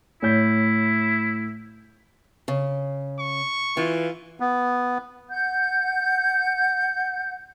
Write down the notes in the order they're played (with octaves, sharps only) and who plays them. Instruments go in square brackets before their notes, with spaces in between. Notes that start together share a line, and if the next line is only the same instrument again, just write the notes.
[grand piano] A2 C#5 G6 [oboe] E4
[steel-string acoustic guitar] C#3
[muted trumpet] C#6
[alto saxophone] E3 [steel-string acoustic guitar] F4
[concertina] B3
[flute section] F#5 G6